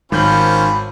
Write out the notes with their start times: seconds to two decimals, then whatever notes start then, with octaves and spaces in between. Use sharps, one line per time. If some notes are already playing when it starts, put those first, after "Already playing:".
0.12 G#1 D#3 C#4 F4 C5 B5 G6 F#7